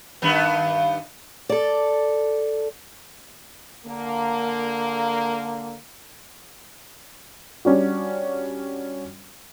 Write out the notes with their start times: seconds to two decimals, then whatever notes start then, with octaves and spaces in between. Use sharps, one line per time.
0.22 G2 D#3 B3
1.49 A4 D5
3.86 D3 A#3
7.65 G3 C#4 D4 F#4